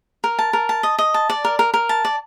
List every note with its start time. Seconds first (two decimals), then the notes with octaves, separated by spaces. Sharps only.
0.24 A#4
0.39 A5
0.53 A#4
0.69 A5
0.83 D#5
0.99 D#5
1.14 A5
1.30 D5
1.45 A#4
1.59 A#4
1.74 A#4
1.89 A5
2.05 D5